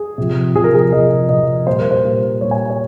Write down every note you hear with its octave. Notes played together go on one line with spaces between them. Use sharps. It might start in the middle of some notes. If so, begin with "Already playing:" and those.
Already playing: G#4
C3 F3
C3 F3 G#4
A#4
G#4
C3 F3 D#5
C3 F3 D#5
A#2 G3 C5
A#4
C5
A#2 G3
A#2 G3 C#5
G#5
C#5